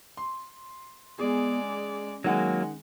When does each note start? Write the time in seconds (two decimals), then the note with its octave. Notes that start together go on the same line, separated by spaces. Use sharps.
0.17 C6
1.19 G#3 B3 G#4 D5
1.63 C#4
2.24 D#3 F#3 G#3 A#3 F#5